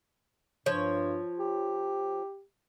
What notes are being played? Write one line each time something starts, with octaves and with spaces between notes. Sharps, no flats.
G2 F3 C#5
G4